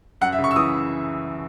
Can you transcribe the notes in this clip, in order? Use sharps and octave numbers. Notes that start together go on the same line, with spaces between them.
F#2 F#5
E5
C#3
C#6
E6
E3 D#6